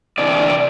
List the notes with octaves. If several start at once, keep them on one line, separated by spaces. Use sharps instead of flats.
C3 E3 G3 D4 D5